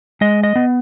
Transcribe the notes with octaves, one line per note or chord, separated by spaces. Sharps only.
G#3 D#5
D#5
B3